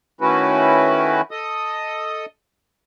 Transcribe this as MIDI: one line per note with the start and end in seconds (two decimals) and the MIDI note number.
0.21 1.21 51
0.21 1.21 57
0.21 1.21 61
0.21 1.21 64
0.21 1.21 66
0.21 1.21 71
1.31 2.26 69
1.31 2.26 75
1.31 2.26 87